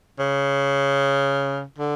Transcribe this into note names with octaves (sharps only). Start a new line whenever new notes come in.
C#3
D3